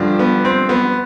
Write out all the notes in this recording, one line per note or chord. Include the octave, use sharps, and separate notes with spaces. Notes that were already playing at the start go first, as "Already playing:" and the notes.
Already playing: G2 D3 F3
B3
C4
B3